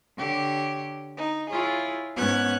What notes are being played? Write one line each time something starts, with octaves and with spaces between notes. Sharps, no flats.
D3 G4 C#5
D#4
E4 F4 G#4 C#5
G#2 B3 C#4 F#6 G#6